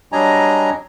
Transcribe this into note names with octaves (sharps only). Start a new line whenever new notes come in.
F#3 G3 D4 D#5 G#5 A#5